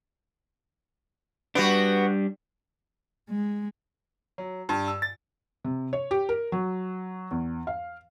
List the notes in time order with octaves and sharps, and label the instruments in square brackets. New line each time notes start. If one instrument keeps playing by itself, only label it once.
[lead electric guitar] G3 D4 [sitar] B3 F#4
[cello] G#3
[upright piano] F#3
G2
E6
A6
[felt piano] C3
C#5
G4
A#4
F#3
E2
F5